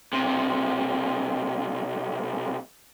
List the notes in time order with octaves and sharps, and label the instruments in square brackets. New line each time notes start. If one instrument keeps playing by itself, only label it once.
[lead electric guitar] B1 C3